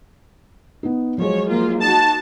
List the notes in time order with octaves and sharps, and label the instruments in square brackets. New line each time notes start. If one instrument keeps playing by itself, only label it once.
[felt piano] B3 D#4
[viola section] F3 C#5 [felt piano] F#3 G#3
[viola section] F3 A#3 F4
[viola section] D#4 F#4 [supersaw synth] A5